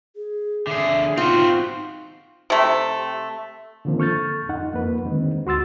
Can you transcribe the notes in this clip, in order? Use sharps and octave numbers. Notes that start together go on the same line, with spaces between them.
G#4
D3 G#4 E5
C4 D#4 F4 F#4
C3 A3
D3 D#3 F3 A#3 C4
A4 C#6 F6 G6 A6
F2 D#4 F#5
F2 A#3 B4
D3 D#3 G#3 C4 D#4
D2 F#4 C6 E6 A6